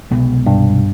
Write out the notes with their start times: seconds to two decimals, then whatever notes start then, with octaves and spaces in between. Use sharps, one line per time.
0.11 C2 B2 G#3 B3
0.47 G2